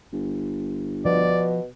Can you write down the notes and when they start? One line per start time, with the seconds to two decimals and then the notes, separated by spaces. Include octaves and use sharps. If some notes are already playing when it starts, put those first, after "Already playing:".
0.13 G1
1.05 B2 F3 D5